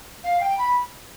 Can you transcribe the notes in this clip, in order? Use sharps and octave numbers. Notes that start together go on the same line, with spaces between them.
F5
G5
B5